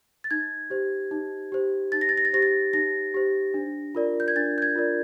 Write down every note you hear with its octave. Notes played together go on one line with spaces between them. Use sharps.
A6
D#4 G#6
G4 C5
D#4
G4 C5
D#4 A6
A#6
A6
A#6
A6
G4 C5 A#6
A6
D#4 A#6
G4 C5
D4
F4 A#4 D5
G6
G#6
D4 A6
G6
G#6
F4 A#4 D5